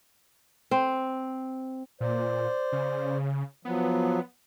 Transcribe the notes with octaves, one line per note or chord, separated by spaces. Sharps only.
C4
A#2 C5 D5
C#3
F3 F#3 B3